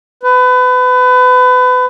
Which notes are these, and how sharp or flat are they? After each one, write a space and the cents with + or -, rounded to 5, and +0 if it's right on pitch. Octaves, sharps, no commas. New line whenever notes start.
B4 +30